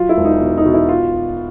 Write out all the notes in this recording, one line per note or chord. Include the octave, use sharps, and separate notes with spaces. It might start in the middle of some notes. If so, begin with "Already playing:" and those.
Already playing: F#3 F4
E4
E1
D#4
B2
D#4
B2
E4
F4